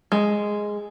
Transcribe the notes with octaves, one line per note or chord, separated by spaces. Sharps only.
G#3